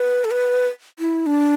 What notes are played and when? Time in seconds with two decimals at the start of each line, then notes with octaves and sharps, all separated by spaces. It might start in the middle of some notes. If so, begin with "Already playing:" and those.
Already playing: B4
0.24 A4
0.31 B4
0.99 E4
1.26 D4